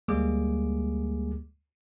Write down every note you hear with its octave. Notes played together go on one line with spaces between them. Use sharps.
D2 G3 G#3 A#3 G#4 D6